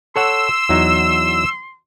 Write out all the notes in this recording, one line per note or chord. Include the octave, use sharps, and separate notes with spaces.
A4 C#5 F#5 C6 E6
E2 F#3 D#4